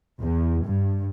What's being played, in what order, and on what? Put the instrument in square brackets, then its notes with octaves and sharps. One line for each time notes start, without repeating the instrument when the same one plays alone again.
[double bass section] E2
G2